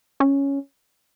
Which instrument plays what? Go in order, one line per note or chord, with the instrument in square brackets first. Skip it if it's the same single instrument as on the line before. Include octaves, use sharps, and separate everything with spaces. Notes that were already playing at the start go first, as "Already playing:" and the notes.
[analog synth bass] C#4